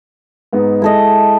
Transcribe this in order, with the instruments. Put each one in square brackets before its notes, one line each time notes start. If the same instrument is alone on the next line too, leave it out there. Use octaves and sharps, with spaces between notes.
[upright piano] G#2 B3 D#4
[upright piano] G#3 [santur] E4 A4 D#5